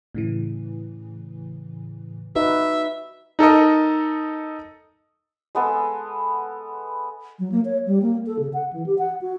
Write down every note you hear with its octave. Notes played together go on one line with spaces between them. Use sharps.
A2 C#3 E3
D#4 F#4 B4 E5
D#4 A4 A#4 D#5
G#3 B3 A4
F#3
A#3
C#5
G3
A#3
A4
C#3
F#5
E3
G4
F#5
F#4